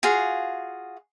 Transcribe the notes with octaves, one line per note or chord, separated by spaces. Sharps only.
F4 F#4 G#4 F5